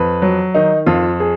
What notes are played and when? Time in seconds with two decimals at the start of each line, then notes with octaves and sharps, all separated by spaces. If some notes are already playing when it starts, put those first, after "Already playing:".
Already playing: F2 B4
0.22 F#3
0.54 D#3 D#4
0.86 F2 F4
1.20 G#4